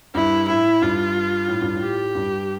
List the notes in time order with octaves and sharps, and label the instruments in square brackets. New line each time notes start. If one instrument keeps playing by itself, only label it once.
[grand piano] G2 [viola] E4
[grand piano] A2 [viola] E4
[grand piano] G2 [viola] F4
[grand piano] A2
G2
A2
[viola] G4
[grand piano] G2